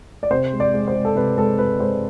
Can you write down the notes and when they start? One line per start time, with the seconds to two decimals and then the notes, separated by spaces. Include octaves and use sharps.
0.23 D5
0.30 C3 C5
0.53 G#3
0.60 D5
0.74 G#3
0.88 C5
0.95 G#3
1.05 A4
1.15 C3 B4
1.37 G#3 A4
1.58 G#3 B4
1.80 G#3 C5